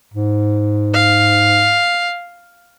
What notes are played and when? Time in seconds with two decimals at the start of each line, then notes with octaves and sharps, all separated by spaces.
0.14 G#2
0.94 F5